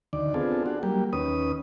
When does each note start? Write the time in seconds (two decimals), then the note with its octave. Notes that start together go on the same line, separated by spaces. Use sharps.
0.13 D2 D#3 D5
0.34 B3 C4 D4 F4 G#4 A4
0.66 D4 F#4
0.83 F#3 G3 A#3 G4
1.13 D#2 C#4 B4 D#6